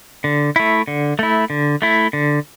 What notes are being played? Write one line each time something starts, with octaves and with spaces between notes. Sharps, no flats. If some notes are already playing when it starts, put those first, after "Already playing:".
D3
A3 E4
D3
A3 E4
D3
A3 E4
D3